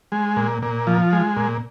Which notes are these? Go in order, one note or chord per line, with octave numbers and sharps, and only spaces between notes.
G#3
A#2
A#2
F3
G#3
A#2